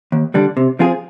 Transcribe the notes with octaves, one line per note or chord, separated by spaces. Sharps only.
D#2
D3 G3 D4
C3
F3 C4 F4 G#4